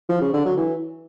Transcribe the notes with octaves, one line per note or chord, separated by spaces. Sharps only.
F3
C#3
D3
F#3
E3